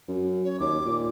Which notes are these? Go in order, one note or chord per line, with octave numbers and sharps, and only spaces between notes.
F#2
C#5
D#2 D6
A#2